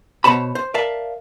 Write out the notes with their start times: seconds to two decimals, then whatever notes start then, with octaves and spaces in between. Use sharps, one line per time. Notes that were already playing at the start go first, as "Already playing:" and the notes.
0.24 B2 C5 C#5 A5 B5
0.55 C5
0.74 A#4 D5 E5 F5 A5